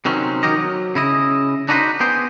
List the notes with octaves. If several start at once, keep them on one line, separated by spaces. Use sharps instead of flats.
C3 D#3 F#3 C4 C#4
D#3 F#3 G4 A#4 C#5 D#5
F#3
C#3 E4 D#5
D4 D#4 F#4 G#4 B4 C5
B3 G#4 C5 G5